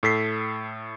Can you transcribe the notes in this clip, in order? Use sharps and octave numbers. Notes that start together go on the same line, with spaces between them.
A2 A4 B6 C7